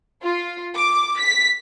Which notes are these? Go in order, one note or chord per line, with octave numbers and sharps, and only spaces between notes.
F4
D6
B6